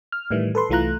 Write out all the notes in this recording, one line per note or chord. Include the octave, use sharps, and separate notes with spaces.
F6
A2 D#3 E3 G3
A4 B4 C6
C2 E3 A3 F4 A#5 F#6